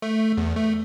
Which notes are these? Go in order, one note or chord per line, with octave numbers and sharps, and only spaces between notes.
A3
E2
A3